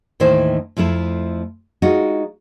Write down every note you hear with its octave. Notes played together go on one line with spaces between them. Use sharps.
D#2 A2 D#3 E3 E4 C5
F2 F3 A3 E4
G#3 D#4 F4 F#4